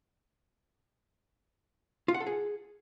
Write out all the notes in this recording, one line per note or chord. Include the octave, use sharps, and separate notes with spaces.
F4
F#5
A4
G#4